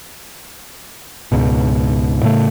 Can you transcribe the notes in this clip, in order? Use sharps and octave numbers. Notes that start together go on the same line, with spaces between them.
C#2 G#2 B2
A2 C#3 A3